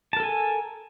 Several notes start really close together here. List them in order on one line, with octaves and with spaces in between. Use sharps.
A5 A#4 A4 G#5